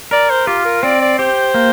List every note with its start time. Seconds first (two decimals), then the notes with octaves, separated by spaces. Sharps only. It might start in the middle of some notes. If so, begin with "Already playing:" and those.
0.11 A#4 D5
0.30 C5
0.47 F4 G4
0.65 A#4
0.83 C4 D5
1.01 D5
1.18 G4 C5
1.54 A#3